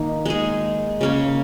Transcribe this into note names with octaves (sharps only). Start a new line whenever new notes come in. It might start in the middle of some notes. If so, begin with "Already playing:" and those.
Already playing: D#3 A#3 D#4
G#3 D#4 G#4
C#3 A#3 C#4